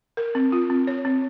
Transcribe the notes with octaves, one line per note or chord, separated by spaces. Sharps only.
A#4
C4
F4
C4
C#5
C4